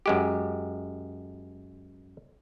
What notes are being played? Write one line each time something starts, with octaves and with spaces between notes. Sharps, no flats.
F#2 G#3 G4